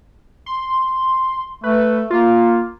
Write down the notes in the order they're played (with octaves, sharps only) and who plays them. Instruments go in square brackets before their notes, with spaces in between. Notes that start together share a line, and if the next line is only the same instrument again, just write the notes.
[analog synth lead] C6
[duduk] A3 [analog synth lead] B4
[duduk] A#3 [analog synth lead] F4